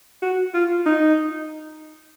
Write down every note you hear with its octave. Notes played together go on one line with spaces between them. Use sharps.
F#4
F4
D#4